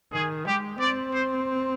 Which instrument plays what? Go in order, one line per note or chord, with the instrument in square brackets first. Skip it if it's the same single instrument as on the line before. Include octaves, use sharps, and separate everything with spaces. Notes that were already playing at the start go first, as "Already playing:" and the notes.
[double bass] D#3 [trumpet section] G#4
[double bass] G#3 [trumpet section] G4
[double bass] C4 [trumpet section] D5
[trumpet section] C5